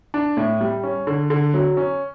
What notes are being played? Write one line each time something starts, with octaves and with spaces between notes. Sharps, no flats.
D4
A2
G3
C#4
D3
D3
F#3
C#4